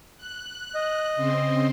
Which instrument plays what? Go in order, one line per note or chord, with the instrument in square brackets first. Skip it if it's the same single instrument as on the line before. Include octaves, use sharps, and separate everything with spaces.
[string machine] F#6
[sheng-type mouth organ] D#5
[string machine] C#3 C4 C5